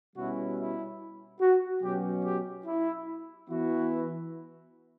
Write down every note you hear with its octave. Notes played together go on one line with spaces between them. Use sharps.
B2 G3 C#4 E4 F#4
E4
F#4
B2 F#3 C#4 G4
G4
E4
E3 B3 E4 F#4